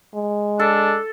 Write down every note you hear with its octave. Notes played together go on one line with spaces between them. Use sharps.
G#3
D4 A4